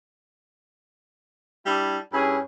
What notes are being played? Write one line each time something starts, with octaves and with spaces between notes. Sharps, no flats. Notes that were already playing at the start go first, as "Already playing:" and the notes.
G3 D4 E4
G2 C#4 E4 G#4